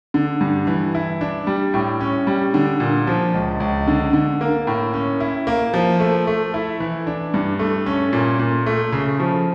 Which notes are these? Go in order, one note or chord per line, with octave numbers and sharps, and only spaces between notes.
D3
G2
E3
E4
D4
G3
A2
C#4
G3
D3
A#2
F3
C#2
C#2
D3
D3
A#3
A2
C#4
E4
A#3
F3
A3
A3
E4
E3
D4
G2
A3
C#4
A#2
A#2
A3
C#3
F3